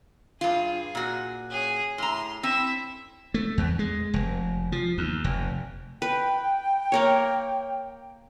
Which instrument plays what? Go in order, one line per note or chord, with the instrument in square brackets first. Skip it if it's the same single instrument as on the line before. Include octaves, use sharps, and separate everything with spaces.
[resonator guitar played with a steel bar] G2 F4 [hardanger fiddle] G#4
[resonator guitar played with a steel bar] A#2 F#4
[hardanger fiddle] C#4 G#4
[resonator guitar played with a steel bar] A2 A#5 [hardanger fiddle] C6
[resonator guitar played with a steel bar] C4 [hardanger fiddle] E4 E5
[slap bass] A3
E2
G#3
F1
F3
D#2
F1
[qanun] B4 [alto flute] G5
[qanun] A#3 A#4 C#5